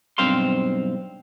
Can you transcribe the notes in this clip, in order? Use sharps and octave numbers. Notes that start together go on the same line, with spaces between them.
B1 G2 C4 C5 F5 C6